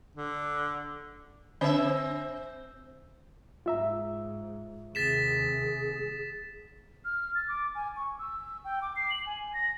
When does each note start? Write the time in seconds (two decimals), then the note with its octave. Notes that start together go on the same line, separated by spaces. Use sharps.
0.16 D3
1.61 D3 C4 D4 E5
3.66 G#2 F4 E5 A#5
4.95 D#2 C3 G#4 A6 B6 E7
7.05 F6
7.35 A6
7.48 D6
7.75 G#5
7.96 C#6
8.19 E6
8.64 G5
8.82 D6
8.96 C7
9.10 F#7
9.26 G#5
9.54 A#6